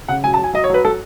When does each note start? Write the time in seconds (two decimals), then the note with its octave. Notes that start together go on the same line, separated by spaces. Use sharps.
0.08 C#3 F#5
0.24 F#3 G#5
0.34 A5
0.38 F#3
0.44 G#5
0.53 F#3 D#5
0.64 C#5
0.70 F#3 B4
0.84 F#3 A4